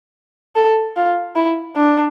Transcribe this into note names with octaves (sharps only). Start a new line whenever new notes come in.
A4
F4
E4
D4